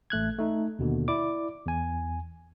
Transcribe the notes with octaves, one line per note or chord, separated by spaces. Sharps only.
A1 A3 F#6 G#6
A3 D#4
D#2 B2 D3
E4 D5 D6
E2 G#5